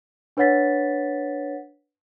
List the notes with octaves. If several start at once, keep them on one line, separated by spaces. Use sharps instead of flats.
D4 B4 C#5 F#5 A6 B6